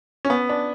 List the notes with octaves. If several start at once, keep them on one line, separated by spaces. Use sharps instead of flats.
C#4
B3
D4